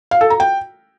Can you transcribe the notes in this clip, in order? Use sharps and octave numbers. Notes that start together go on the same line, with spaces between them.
F5
A4
A#5
G5